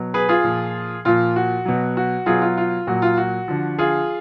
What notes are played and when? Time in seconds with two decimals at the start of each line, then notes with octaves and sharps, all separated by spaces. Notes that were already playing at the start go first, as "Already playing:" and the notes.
Already playing: B2 F#3
0.14 G#4 B4
0.29 F4 G#4
0.44 A#2 F3
1.05 A#2 F3 F4
1.36 F#4
1.65 B2 F#3
1.97 F#4
2.26 B2 F#3 F4 G#4
2.42 F4
2.57 F4
2.87 A#2 F#3 F#4
3.02 F4
3.17 F#4
3.48 D3 F3
3.78 F4 G#4